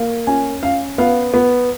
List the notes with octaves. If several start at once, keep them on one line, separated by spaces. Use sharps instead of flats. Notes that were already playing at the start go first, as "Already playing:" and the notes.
Already playing: A#3
C#4 G#5
C#4 F5
B3 F5
B3